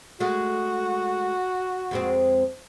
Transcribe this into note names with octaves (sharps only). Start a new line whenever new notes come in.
G#3 A3 F#4
F2 G#3 C4